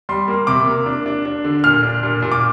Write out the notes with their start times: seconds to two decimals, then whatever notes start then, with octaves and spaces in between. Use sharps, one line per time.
0.09 G3 C6
0.28 A#3
0.47 C3 D6
0.68 A#3
0.86 D4
1.06 D4
1.26 D4
1.44 D3
1.64 A#2 F6
1.83 D4
2.03 A#2
2.22 A#2
2.32 D6